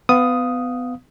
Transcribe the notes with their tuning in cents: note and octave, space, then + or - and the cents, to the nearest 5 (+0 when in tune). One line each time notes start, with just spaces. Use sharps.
B3 +25 F5 +5 D#6 +0